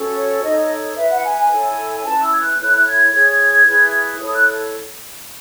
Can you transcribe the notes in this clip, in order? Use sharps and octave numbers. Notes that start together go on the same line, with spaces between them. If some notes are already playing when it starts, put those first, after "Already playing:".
Already playing: C#4 F#4 A4
C#5
D#4 A4 C#5 D#5
E4 B4 E5
F#5
G#5
G#5
E4 A4 C#5
G#5
C#4 E4 B4 A5
E6
G#6
F#6
E4 A4 C#5 F#6
G#6
E4 G#4 C#5
E4 G#4 B4
E4 A4 C#5 D#6
F#6